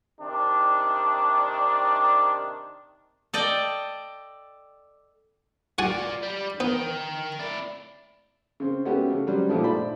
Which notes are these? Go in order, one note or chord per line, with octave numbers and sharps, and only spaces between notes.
C3 D#3 D4
A4 D5 D#5 G5
F4 F#4 D5 F#5 G#5
G3 G4
B3 A#4 G5
E4 D5
C#3 C4
G#3 A3 B3 C#4 F#4 G4
C#3
F#3 G3 C4 C#4
G2 A#2 D#3 F3 A3
G#2 A3 C5 D5 B5